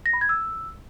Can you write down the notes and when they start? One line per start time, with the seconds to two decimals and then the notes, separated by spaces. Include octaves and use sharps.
0.06 A#6
0.13 B5
0.21 G#6
0.29 E6